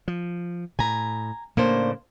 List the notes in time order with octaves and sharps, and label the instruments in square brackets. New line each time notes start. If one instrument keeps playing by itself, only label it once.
[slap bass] F3
[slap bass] A2 [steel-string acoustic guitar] G#5 A#5
[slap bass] A2 C#3 [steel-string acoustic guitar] A#3 D4 C5